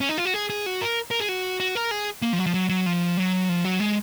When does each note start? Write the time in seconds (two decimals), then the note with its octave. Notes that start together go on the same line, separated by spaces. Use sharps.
0.01 C#4
0.09 D#4
0.18 F4
0.25 F#4
0.34 G#4
0.50 G#4
0.66 F#4
0.81 A#4
1.11 A#4
1.20 G#4
1.29 F#4
1.60 F#4
1.75 A#4
1.91 G#4
2.22 A#3
2.33 F3
2.39 F#3
2.46 F3
2.54 F#3
2.69 F#3
2.86 F3
3.17 F#3
3.49 F3
3.64 F#3
3.80 G#3